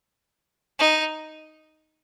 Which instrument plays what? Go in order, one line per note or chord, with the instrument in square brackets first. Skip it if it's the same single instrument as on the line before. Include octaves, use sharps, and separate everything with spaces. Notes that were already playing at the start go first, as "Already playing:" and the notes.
[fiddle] D#4